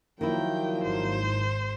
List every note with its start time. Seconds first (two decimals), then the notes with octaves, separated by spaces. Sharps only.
0.21 D#3 F3 F#3 A#3 E4 G5
0.84 G#1 C5